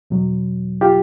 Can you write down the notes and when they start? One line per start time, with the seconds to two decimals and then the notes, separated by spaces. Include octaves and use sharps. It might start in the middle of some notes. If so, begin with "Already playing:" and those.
0.10 E2 B2 F#3
0.81 F4 G4